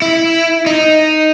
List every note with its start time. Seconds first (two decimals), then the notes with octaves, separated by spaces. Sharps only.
0.02 E4
0.66 D#4